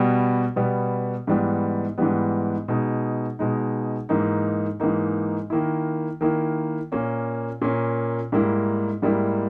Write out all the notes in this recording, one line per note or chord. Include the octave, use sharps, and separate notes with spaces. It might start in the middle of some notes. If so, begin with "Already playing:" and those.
Already playing: B2 G3 B3
B2 G3 B3
G#2 E3 G3 B3
G#2 E3 G3 B3
B2 G#3 D#4
B2 G#3 D#4
G#2 E3 A#3 D#4
G#2 E3 A#3 D#4
D#3 A#3 E4
D#3 A#3 E4
A#2 A#3 C#4
A#2 A#3 C#4
G#2 G3 A#3 E4
G#2 G3 A#3 E4